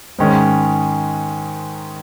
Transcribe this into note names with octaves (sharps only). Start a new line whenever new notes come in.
G#2 D#3 G#3 C#4